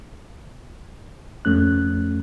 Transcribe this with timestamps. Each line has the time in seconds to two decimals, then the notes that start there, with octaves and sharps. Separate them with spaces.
1.45 F2 A3 C#4 F#6